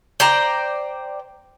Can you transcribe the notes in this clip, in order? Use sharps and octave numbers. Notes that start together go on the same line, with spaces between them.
C5 D5 G5 A#5